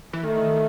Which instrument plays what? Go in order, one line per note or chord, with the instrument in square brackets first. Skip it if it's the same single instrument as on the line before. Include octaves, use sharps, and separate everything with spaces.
[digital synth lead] E3
[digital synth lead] D#3 [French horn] A3